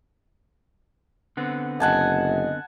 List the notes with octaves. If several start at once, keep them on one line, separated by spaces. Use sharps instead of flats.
D3 B3 C4
F#1 D#5 F#5 G#5 A5